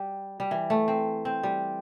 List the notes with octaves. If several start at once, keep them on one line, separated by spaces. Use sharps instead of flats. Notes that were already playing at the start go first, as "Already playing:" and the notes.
Already playing: G3
G3
E3
A3
C4
C4
G3